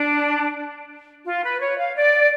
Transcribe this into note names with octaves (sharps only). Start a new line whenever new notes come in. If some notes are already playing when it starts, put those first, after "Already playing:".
Already playing: D4
F4
B4
C#5
F5
D5